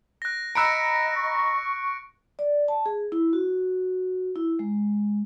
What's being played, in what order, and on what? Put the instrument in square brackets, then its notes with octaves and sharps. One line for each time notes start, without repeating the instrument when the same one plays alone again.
[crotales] F#6 A#6
[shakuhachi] D#5 [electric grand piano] A#5 B5 E6 [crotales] F#6 C#7 D7
[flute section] C#6
[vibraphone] D5
A5
G#4
E4
F#4
E4
G#3